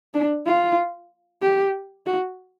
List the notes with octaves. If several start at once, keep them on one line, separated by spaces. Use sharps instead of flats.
D4
F4
G4
F#4